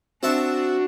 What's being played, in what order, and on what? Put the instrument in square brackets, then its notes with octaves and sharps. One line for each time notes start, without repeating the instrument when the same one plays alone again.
[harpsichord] C4 E5 A5 [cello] D4 [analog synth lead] F#4